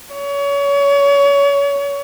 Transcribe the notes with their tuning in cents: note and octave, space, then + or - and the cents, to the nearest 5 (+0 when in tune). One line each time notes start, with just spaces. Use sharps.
C#5 +30